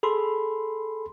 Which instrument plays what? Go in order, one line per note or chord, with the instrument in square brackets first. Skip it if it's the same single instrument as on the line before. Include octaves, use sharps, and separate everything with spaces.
[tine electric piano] G#4 A4 B5 C6